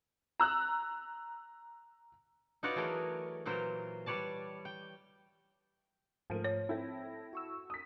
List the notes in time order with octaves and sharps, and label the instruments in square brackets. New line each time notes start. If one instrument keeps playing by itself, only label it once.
[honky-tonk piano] A#5 E6 F#6
[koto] D#4 F4 F#4 B4 C#5 D5
E3 F#3 A3 G#4 A#4
A#2 E3 F#3 A#4 C5
G3 B4 C#5 D5 A5
G5
[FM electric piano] G#2 A3 [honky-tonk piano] F3 A#4 D#7
[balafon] C#5
[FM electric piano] C4 G5 A#6 [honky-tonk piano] E4 A4
[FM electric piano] F#4 C#6 E6
[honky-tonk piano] D#6 B6